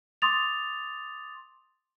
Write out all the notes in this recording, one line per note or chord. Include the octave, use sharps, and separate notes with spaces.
C6 D6 D#6 A6 F7